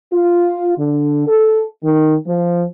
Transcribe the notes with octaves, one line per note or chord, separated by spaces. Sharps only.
F4
D3
A4
D#3
F3